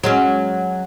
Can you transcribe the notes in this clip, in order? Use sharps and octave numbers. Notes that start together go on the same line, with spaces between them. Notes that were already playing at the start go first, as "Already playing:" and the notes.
F#3 G#3 C#4